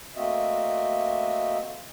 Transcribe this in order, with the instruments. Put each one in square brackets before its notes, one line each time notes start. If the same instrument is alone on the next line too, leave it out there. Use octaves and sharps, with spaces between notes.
[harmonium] A3 A#3 C4 F#4 D#5 E5